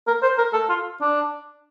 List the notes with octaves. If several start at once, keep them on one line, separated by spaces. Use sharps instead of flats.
A#4
C5
A#4
A4
F4
D4